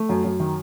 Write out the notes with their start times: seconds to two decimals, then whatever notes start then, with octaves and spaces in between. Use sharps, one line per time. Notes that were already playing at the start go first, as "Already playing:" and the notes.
Already playing: A3
0.09 F#2
0.24 F#2
0.40 D#3